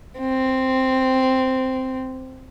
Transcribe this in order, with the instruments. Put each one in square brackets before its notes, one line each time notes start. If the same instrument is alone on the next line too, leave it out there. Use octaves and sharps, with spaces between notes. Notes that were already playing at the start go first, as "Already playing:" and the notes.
[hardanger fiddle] C4